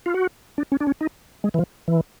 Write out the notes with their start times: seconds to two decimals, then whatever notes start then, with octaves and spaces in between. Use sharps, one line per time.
0.06 F4
0.14 F#4
0.58 D4
0.72 C#4
0.80 D4
0.87 C#4
1.01 D#4
1.44 G#3
1.54 E3
1.59 F3
1.88 E3